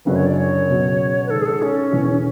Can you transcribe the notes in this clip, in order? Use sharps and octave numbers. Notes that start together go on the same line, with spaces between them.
F#1 F#2 D3 F#3 C#4 B4
C#5
D5
C#5
C#2 B2 F#3
B4
G#1 G#2 G#3 A4
G#4
A4
C#4
E1 E2 B2